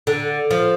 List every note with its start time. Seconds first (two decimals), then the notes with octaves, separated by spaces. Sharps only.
0.07 D3
0.51 F3